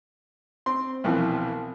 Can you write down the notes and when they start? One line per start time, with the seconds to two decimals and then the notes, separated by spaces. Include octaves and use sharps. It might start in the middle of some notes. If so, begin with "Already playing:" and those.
0.66 C4 C6
1.04 C2 B2 E3 F3